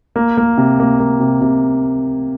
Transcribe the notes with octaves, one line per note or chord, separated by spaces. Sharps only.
A#3
A#3
C3
A#3
A#3
C3
C3